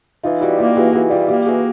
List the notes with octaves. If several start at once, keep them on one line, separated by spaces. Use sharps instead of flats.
E3 D#4 F4
G3 E4 F#4
A#3 F4 G4
E3 F#4 G#4
E3 F#4 G#4
G3 F4 G4
A#3 F4 G4
E3 F#4 G#4